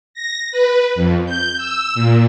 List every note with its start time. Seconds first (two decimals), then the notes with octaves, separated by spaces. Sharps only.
0.14 A#6
0.52 B4
0.95 F2
1.26 G6
1.57 E6
1.95 A#2